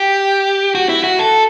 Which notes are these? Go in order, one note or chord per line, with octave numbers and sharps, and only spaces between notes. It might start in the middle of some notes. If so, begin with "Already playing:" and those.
Already playing: G4
F#4
E4
F#4
A4